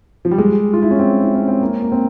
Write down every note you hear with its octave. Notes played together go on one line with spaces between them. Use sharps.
F3
G3
G#3
F4
E4
C#4
C4
E4
C#4
C4
A#3
A#3
C4